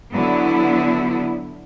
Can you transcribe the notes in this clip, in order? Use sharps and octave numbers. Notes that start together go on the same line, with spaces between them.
D3 F#3 B3 E4